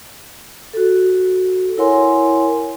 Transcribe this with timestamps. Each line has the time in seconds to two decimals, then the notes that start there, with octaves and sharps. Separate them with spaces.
0.73 F#4 A4
1.78 E4 A#4 C#5 F#5 G#5 C6